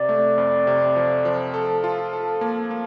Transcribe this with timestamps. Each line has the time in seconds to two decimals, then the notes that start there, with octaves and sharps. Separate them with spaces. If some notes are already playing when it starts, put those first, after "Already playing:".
Already playing: C3 D5
0.09 A3
0.38 F2
0.67 C3
0.96 F3
1.25 F3
1.54 A4
1.84 F4
2.13 A4
2.41 A#3
2.71 A#3